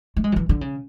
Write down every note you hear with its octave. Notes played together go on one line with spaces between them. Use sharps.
A3
G#3
F#3
E3
D3
C#3